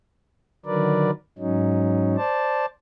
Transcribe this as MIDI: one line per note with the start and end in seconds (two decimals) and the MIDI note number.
0.66 1.11 50
0.66 1.11 51
0.66 1.11 54
0.66 1.11 70
0.66 1.11 71
0.66 1.11 74
1.38 2.16 44
1.38 2.16 54
1.38 2.16 61
1.38 2.16 63
2.17 2.66 72
2.17 2.66 74
2.17 2.66 81